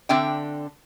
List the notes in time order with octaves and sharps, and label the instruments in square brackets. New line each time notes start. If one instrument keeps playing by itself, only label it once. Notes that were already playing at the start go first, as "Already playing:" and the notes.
[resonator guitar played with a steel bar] D3 C4 D4 E5 G5